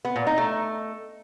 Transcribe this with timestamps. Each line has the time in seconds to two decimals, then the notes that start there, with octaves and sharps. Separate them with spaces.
0.05 B3
0.16 A#2
0.27 D#4
0.38 A3